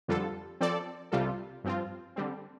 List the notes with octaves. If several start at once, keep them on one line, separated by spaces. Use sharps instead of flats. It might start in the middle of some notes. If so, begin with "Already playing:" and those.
F2 D3 G3 F4 A4
F3 C4 A4 D5
C2 C3 G3 F4 A4
G2 F3 C4 F4
D3 G3 C4